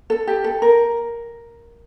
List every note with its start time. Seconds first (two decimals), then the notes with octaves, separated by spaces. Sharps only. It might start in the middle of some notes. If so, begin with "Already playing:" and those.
0.10 A4
0.27 G4
0.44 A4
0.62 A#4